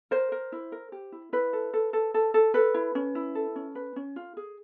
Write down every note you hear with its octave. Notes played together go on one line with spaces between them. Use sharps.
A#4 C5
A#4
E4
A#4
G4
E4
E4 B4
A4
A4
A4
A4
A4
A4 B4
E4
C#4
E4
A4
C#4
B4
C#4
F4
G#4